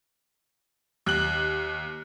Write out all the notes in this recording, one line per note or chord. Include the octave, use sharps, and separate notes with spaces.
D#2 F#6 F#7